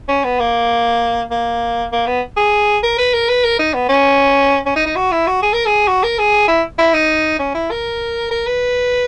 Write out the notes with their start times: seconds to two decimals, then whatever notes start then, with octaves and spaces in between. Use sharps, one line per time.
0.08 C#4
0.24 B3
0.40 A#3
1.31 A#3
1.92 A#3
2.07 B3
2.37 G#4
2.83 A#4
2.98 B4
3.14 A#4
3.29 B4
3.45 A#4
3.59 D#4
3.74 B3
3.89 C#4
4.66 C#4
4.76 D#4
4.86 D#4
4.96 F#4
5.12 E4
5.27 F#4
5.42 G#4
5.53 A#4
5.66 G#4
5.88 F#4
6.03 A#4
6.19 G#4
6.48 E4
6.78 E4
6.94 D#4
7.39 C#4
7.55 E4
7.71 A#4
8.31 A#4
8.47 B4